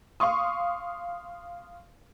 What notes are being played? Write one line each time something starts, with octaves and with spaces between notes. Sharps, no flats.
F5 C6 C#6 D#6